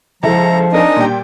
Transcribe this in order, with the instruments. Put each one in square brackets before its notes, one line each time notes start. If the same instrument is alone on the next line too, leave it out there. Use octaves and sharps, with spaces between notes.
[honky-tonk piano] C#2 E4 A4 [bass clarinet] F3 [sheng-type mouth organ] A#5
[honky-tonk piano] C4 A#4 G#5 [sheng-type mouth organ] D4 D#4 D#5
[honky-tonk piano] A#2 G3 G5